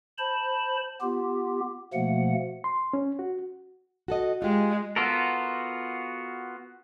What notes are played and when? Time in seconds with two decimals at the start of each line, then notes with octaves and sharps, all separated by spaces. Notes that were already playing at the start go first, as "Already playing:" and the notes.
0.18 C5 A5 B5
1.01 B3 F4 G4
1.93 B2 F3 A3 A#3 F#5
2.64 C6
2.93 C#4
3.19 F#4
4.08 F#4 A4 D#5
4.42 G#3 F4 G4
4.96 B3 F4 F#4 A4 A#4